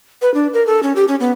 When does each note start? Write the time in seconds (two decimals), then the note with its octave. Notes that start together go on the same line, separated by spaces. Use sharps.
0.22 B4
0.34 D4
0.54 A#4
0.67 A4
0.83 C#4
0.96 G4
1.08 C#4
1.20 B3